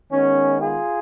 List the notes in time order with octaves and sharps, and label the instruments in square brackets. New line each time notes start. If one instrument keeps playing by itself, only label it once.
[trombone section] D#3 G#3 B3 C#4
F4 G#4